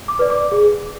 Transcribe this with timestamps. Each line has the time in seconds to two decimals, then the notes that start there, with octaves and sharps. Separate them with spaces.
0.08 D6
0.19 B4 D5
0.30 D6
0.52 G#4